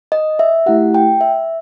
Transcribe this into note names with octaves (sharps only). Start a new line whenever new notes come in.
D#5
E5
A3 E4 G4 F#5
G5
E5